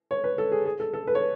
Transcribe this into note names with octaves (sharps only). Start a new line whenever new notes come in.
C#5
B4
A4
G#4
G#4
A4
A4
B4
C#5